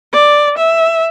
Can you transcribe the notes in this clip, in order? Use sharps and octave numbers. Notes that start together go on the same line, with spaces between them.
D5
E5